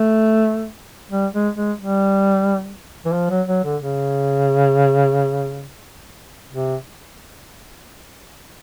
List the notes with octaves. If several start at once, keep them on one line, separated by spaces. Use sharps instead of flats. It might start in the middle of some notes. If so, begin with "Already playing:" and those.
Already playing: A3
G3
G#3
G#3
G3
E3
F3
F#3
F#3
D3
C#3
C3